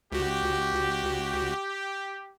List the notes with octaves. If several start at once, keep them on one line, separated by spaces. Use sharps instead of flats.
C#2 F#4 G4